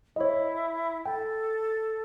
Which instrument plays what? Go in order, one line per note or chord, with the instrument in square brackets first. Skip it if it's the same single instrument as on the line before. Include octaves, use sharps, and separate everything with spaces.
[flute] E4 [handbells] C#5 D#5
[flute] A4 [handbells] G5